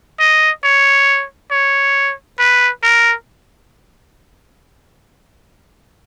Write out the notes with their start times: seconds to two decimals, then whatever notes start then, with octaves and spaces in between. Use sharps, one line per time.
0.20 D#5
0.63 C#5
1.51 C#5
2.39 B4
2.83 A#4